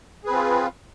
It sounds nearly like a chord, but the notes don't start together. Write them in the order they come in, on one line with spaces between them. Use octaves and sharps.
G#4 B4 C4 F4